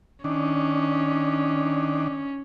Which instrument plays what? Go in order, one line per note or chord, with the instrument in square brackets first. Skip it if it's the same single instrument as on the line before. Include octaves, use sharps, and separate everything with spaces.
[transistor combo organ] D#3 D4 [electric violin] C#4